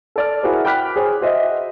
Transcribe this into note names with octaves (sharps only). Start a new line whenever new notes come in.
A4 D5 F6
E4 F#4 G#4 A#4 C5
G5 B5 D6 F6 F#6 B6
G#4 C5 C#5
F#4 C5 D#5 E5